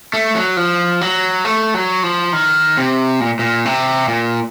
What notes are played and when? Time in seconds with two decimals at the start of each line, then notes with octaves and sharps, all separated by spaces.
0.14 A3
0.35 F#3
0.57 F3
1.01 F#3
1.45 A3
1.74 F#3
2.03 F3
2.33 D#3
2.77 C3
3.20 A#2
3.39 A#2
3.65 C3
4.08 A#2